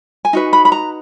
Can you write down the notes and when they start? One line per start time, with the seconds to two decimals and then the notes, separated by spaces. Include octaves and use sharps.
0.25 G#5
0.33 D#4 F#4 B4
0.53 B5
0.65 B5
0.72 A#5